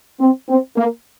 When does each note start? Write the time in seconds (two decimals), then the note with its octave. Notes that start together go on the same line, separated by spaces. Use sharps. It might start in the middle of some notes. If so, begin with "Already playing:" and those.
0.20 C4
0.48 C4
0.76 A#3